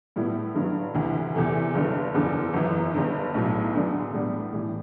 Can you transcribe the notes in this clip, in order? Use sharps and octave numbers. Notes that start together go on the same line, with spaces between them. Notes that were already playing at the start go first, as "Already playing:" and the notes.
A2 G3 B3 E4
G1 G2 D3 F#3
D2 C3 E3
E2 C3 E3 A3
G1 G2 D3
F#1 E2 D3
G1 F#2 E3
G1 G2 D3
B1 A2 F#3
E2 D3 F#3 B3 D4
A2 G3 B3 D4
A2 E3 G3